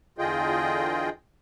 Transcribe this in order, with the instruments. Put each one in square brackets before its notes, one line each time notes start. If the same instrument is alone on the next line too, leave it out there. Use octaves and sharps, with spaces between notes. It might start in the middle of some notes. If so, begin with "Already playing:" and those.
[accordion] E2 D3 F4 G#4 D#5 G5